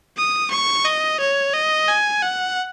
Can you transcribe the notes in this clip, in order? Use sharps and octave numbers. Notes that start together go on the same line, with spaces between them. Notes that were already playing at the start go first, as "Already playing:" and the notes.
D#6
C#6
D#5
C#5
D#5
G#5
F#5